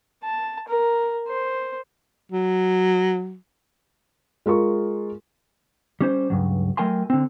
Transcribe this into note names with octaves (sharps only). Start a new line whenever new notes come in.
A5
A#4
C5
F#3
G#3 F4 A#4 C#6
G3 C#4 C5
C#2 G2 F#3
F#3 A3 A#4 G5 G#5 C6
D3 C4